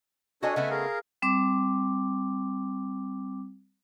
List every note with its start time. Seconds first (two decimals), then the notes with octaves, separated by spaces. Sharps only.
0.43 D4 F#4 A4 C#5 D#5 G#5
0.56 C#3 A3 B3 E5 F#5 G#5
0.70 G#4 A#4 F5
1.22 G3 C4 D6